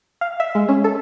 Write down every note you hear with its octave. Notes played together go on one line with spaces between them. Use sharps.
F5
E5
G#3
C#4
A4